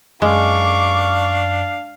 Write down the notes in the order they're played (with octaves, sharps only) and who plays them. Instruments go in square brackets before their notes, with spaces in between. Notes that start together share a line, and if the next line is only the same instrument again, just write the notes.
[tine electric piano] F#2 [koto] G#3 [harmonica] D4 F5 [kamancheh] C#6 D6